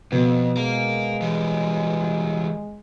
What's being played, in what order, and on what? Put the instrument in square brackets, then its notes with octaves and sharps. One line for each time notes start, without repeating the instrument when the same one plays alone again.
[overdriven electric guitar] F2 [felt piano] B2
[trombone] G#3 [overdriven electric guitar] F5 A#5
[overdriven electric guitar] E3 G3